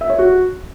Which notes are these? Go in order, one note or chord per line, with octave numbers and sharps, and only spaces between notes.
E5
C#5
F#4